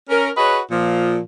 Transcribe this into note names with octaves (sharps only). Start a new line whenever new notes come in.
C#4 A#4
F#4 G#4 B4 C#5 D#5
A#2 F3